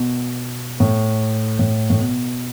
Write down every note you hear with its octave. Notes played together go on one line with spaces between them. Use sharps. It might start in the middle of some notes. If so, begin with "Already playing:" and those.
Already playing: B2
A2
A2
A2
B2